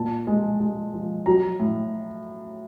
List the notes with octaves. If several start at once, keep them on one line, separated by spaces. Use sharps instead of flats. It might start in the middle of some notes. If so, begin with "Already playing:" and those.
Already playing: A#2 A5
G#3
G#3
F3
F#3 A#5
A2